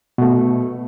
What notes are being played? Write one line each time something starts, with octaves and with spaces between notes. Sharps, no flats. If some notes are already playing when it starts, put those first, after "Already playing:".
B2 A3